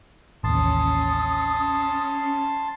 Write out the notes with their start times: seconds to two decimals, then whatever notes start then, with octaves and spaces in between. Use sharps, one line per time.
0.44 A1 D#2 C#4 A5 C6 D#6